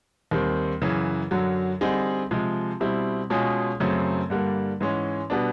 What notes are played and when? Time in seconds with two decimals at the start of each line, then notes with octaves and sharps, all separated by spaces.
0.31 D#2 D#3 G3 C4
0.82 F#2 C#3 E3
1.31 F#2 D3 F#3
1.81 D3 G3 C4 D#4 G#4
2.31 C3 F3 G#3
2.80 B2 G3 C4 E4
3.30 B2 G#3 C#4 F4 G#4
3.80 F#2 C#3 F#3 A3 C4
4.30 G2 D3 G3 A#3
4.81 G#2 E3 G#3 C#4
5.30 B2 G3 B3 D4